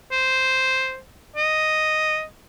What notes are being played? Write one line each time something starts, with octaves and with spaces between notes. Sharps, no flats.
C5
D#5